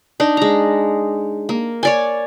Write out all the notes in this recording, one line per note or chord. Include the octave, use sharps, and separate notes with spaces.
D4 D#4
G#3 A#5
A#3
C#5 D5 G#5